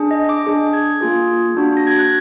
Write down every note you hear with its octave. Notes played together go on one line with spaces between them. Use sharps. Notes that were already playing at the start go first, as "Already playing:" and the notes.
Already playing: D4 G#4
D#5
D6
D4 G#4
G#6
A#3 F4 G#4
A#3 D4 F#4
A#6
G#6
F#6